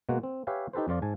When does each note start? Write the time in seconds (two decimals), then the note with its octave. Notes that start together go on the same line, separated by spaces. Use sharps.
0.09 B2 G#3 A#3 F#4 F#5
0.23 C4
0.47 G4 B4 C#5 E5 F5 G#5
0.73 D#4 G4 A4 B4 C5
0.88 F2 F3 F4 D5
1.02 G#2 G#5 A5